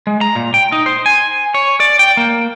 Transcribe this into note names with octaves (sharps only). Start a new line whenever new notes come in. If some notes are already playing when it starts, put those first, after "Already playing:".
G#3
A#5
A#2
G5
D#4
C5
G#5
C#5
D5
G5
A#3